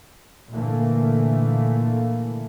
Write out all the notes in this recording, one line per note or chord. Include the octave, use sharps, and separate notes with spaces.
A#2 D3 E3 A3 A#3